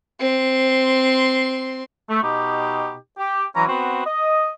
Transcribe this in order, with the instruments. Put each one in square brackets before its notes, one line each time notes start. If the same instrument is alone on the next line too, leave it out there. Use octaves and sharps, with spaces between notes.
[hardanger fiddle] C4 C6
[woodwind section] A3
B2 D#4 G4
G4
E3 F#3 C#4 A#5
B3 C4 F#4
D#5